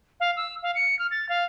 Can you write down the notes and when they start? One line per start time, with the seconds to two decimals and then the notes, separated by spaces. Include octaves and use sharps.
0.20 F5
0.37 E6
0.63 F5
0.75 C#7
0.99 F6
1.11 A6
1.29 F5